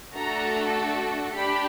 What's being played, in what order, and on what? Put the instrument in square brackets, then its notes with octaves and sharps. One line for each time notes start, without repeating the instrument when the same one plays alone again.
[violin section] A3 D4 F#4 A4 A#5
D4 G4 B5